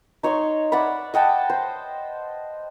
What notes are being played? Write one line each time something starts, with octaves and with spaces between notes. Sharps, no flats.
D#4 C#5 C6 C#6
D5 E5 F#5 B5
D#5 F#5 G5 A5
C5